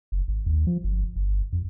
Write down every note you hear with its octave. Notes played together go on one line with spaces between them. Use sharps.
F#1
G#1
D#2
F3
G1
G1
F2